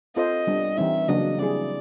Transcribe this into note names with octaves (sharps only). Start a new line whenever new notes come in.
C4 F4 A4 C5 D#5
G3 B3 D4
E3 G3 C4 D#4 E5
C#3 F#3 A#3 D4 F#4 D#5
G3 C4 E4 G#4 D5